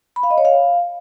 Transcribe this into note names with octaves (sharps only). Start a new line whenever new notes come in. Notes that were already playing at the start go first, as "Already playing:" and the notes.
B5
F5
D#5
C#5
F5